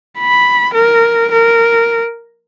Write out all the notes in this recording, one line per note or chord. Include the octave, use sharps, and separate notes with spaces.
B5
A#4
A#4